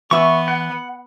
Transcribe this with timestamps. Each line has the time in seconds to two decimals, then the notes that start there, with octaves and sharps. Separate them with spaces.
0.11 E3 B3 E5 C#6
0.48 F#5